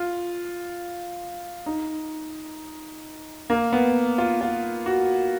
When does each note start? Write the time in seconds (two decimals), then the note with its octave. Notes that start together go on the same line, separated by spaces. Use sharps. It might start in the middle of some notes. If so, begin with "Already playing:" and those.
Already playing: F4
1.66 D#4
3.50 A#3
3.72 B3
4.18 F4
4.41 F4
4.86 F#4